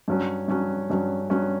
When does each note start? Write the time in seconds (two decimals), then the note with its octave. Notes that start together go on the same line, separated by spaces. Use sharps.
0.08 G2 F#3 C#4
0.48 G2 F#3 C#4
0.90 G2 F#3 C#4
1.30 G2 F#3 C#4